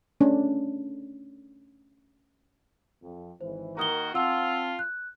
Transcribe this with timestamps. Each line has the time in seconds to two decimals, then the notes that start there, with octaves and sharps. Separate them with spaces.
0.20 A3 C#4 D4
3.03 F2
3.41 G#1 E3 C5
3.77 D#3 A#3 F#4 A#5 D#6 G7
4.15 C4 F4 F#5 G5 A5 E6
4.79 F#6